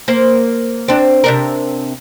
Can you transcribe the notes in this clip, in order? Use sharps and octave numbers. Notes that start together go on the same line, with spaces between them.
A#3 C5
C4 D4
C3 D4 A#4